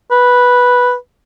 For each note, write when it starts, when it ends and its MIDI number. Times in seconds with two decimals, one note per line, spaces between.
0.11 0.95 71